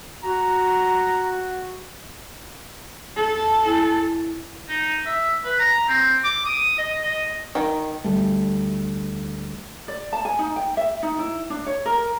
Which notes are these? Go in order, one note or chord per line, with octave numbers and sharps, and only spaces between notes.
F#4 A#5
E2 A4 A5
E4 G#5
D#4
E5
B4
A#5
C4
D6
D#6
D#5
D#5
D#3
D2 G3 A3
D5
A5
G#5
D#4
G5
E5
D#4
E4
D4
C#5
A#4